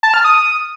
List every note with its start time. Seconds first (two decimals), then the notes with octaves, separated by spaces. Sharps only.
0.03 A5
0.14 F6
0.24 D#6